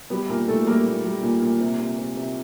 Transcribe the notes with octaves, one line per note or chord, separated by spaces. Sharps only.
G3 B3 B4
A#2 A#3 A#4
A#2 A3 A4
G3 A#3 A#4
A#2
G3
A#2
A#2
C3
C3
C3
C3